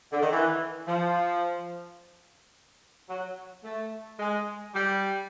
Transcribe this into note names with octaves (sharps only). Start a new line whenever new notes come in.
D3
D#3
E3
F3
F#3
A3
G#3
G3